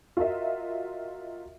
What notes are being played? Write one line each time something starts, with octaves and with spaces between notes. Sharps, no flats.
F4 F#4 A#4 D#5 E5